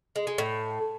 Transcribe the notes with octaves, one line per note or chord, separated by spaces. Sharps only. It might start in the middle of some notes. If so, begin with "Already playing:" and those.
G#3
G#3
A2